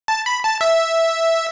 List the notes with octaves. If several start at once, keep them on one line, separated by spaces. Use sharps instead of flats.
A5
B5
A5
E5